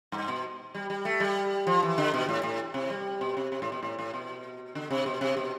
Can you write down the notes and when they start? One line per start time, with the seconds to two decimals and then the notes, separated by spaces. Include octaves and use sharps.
0.12 G2
0.28 B2
0.75 G3
0.90 G3
1.05 A3
1.20 G3
1.67 F3
1.82 E3
1.98 D3
2.14 B2
2.29 A2
2.43 A2
2.74 C3
2.90 G3
3.21 B2
3.37 C3
3.52 C3
3.62 A2
3.72 B2
3.83 A2
3.99 A2
4.14 B2
4.75 D3
4.90 C3
5.06 B2
5.21 C3
5.37 B2